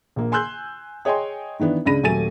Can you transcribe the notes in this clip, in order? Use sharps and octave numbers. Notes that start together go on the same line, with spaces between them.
A#1 A#3
G#5 C6 E6 F#6 G6
G#4 C#5 D#5 G5 G#5 C6
D#3 E3 B3 D4
C#2 C#3 D4 B5 A#6 D#7
D#1 F#3 A3 G#5 A6 D#7